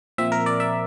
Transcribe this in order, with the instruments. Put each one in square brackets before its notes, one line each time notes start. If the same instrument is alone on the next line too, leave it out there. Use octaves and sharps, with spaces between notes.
[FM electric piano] A#2 F3 C4 E5
A#4
D5
E5